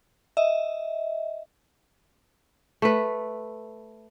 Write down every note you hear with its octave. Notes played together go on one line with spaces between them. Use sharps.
D#5 E5
A3 B4